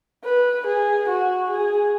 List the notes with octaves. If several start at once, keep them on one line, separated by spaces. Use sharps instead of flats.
B4
G#4
F#4
G#4